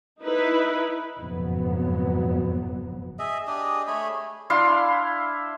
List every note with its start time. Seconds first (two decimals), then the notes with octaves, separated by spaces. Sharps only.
0.22 D#4 E4 B4
1.19 F#1 F2 G#2 B2 F#3 B3
3.19 G#4 D#5 E5
3.47 D4 G4 G#4 D#5
3.88 A3 G#4 C#5 B5
4.50 D4 E4 F5 C6